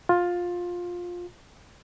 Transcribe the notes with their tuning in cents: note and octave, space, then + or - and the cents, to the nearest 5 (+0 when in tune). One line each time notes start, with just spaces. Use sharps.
F4 +15